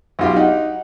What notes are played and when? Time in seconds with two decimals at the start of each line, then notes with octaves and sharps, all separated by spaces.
0.19 B1 F4 G4
0.36 D#4 F#5